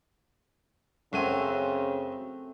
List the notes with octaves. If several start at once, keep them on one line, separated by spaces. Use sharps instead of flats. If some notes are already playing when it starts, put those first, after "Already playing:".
F#2 C#3 F#3 A3 C4 G#5